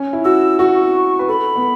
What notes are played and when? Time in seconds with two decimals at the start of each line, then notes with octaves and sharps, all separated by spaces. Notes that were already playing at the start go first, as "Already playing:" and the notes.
Already playing: C#4
0.13 E4
0.25 F#4 E6
0.59 F#4 C#6
1.19 B4
1.28 A4 B5
1.56 B3